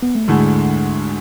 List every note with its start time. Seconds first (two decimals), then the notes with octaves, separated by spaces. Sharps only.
0.02 B3
0.15 A3
0.27 D2 G#2 D3 G#3 A3 E4 G#4